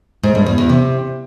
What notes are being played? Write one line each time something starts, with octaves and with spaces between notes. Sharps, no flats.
G#2
G2
E2
E2
C3